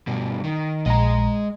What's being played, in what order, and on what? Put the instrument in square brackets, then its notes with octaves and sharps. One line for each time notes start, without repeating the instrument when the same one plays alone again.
[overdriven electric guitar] G2 B2
D#3
[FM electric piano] A#1 A#5 [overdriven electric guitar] G#3 D#5